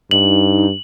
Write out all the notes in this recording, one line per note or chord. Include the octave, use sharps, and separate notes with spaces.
G2 D#4 F#7